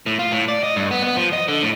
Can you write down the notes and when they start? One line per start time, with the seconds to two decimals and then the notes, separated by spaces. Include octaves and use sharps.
0.06 A2
0.19 F4
0.32 A2
0.48 D5
0.64 D#5
0.76 G2
0.91 B3
1.04 B3
1.17 F3
1.33 D#5
1.48 D3
1.63 A2